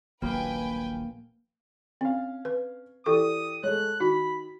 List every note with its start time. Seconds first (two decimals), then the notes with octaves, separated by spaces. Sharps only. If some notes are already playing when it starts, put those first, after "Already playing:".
0.22 D#1 A#1 F#3 A#3 B4 G5 G#5
2.01 C4 C#4 F5
2.45 B4
3.06 E3 G4 A4 D5 C#6 D#6
3.63 G#3 A3 C#5 F#6
4.00 D#3 F#4 B5